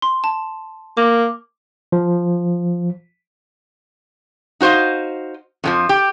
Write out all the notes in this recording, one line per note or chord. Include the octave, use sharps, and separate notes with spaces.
C6
A5
A#3 D6
F3
D#4 F#4 C5 D#5 F5
F2 D3 F3
G4